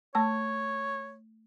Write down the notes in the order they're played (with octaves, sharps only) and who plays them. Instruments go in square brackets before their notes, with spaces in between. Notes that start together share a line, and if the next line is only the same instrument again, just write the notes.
[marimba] A3 A5 E6 [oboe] C#5